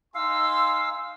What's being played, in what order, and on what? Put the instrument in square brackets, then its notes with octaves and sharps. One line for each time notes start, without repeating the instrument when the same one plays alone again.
[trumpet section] D#4 G#5 C6 [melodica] F5 [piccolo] E6